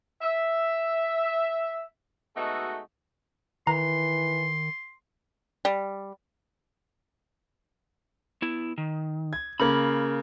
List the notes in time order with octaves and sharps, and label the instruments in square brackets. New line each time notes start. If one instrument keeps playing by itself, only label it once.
[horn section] E5
B2 G#3 A3 D#4 F#4 A4
[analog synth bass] D#3 [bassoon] E3 [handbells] A#5 [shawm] C6
[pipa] G3
[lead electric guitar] B3 E4
D#3
[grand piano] G#6
[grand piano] C#3 A#3 [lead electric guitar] B5